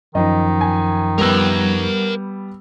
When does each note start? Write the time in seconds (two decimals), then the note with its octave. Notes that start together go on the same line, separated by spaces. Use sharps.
0.15 F#2 D#3 F3 D#4 D#5
0.61 G#5
1.18 G3 B3 A#4 F#5 E6